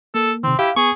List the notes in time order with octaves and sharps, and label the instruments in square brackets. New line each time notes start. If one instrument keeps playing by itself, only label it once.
[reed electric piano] A#3 [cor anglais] A4
[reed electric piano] C3 D#3 [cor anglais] C4
[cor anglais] E4 [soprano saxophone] G4 [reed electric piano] F5
[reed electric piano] B3 [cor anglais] G#4 [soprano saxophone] C#6